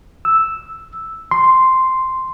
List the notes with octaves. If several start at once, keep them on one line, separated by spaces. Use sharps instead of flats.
E6
C6